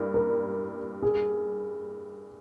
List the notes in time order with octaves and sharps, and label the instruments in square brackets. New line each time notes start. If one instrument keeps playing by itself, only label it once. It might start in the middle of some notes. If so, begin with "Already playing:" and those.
Already playing: [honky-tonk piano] G2 G3 A#3 E4
[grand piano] A#4
G#4